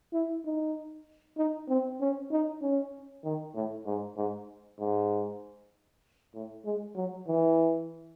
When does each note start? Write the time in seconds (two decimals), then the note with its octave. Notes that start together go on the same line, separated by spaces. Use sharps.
0.13 E4
0.45 D#4
1.37 D#4
1.69 C4
2.00 C#4
2.31 D#4
2.62 C#4
3.24 D#3
3.55 A2
3.86 G#2
4.17 G#2
4.79 G#2
6.34 A2
6.65 G#3
6.96 F#3
7.27 E3